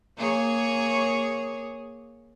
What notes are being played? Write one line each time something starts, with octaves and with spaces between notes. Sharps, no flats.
A#3 G#4 C#5